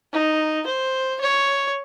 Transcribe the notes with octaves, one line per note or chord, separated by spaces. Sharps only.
D#4
C5
C#5